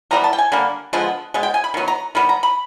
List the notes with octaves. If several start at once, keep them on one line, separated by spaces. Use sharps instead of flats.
E3 G3 B3 A#5
A5
G5
G#5
D3 G3 A#3
D3 F3 G#3 B3
B2 G#3
G5
G#5
B5
D#3 F#3 B3
A#5
D#3 G3 B3 B5
A#5
B5